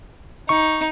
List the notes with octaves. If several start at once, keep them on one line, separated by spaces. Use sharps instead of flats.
D#4 C#6